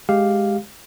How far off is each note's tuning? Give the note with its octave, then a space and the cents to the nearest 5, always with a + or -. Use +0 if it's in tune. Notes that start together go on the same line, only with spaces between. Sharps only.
G#3 +0 G4 +0 F5 +0